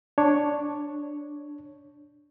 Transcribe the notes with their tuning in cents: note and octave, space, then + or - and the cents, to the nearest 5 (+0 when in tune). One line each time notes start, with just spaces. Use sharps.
D4 +0 C#5 +0